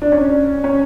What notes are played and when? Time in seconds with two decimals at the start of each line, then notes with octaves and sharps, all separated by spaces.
0.02 D4
0.12 C#4
0.64 C#4